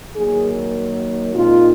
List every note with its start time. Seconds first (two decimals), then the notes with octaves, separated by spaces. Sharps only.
0.15 D#3 F#3 A#3 G#4
1.34 A#2 G#3 C4 D#4 F4